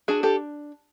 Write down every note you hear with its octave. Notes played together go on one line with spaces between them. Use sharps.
D4 F#4 G#4
G4 A4